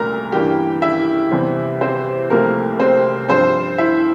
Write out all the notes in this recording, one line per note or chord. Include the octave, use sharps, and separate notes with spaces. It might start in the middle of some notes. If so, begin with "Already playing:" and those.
Already playing: C2 A#2 A3 A#4 A#5
G2 E3 G3 A#3 G4 G5
E4 E5
E2 C3 E3 G3 C4
C4 C5
C2 C3 F3 A3 A#3 C4 A#4
C4 C5
G2 F3 C4 C5
E4 E5